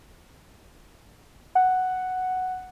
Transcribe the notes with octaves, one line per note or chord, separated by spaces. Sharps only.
F#5